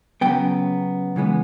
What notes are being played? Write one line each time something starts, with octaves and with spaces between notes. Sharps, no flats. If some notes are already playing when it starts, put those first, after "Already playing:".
C#3 F#3 B3 G5
C#3 E3 G#3 B3